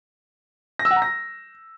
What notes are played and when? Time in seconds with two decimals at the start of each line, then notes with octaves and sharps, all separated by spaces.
0.79 A#6
0.85 E6
0.91 F#5
0.96 A#5
1.02 A#6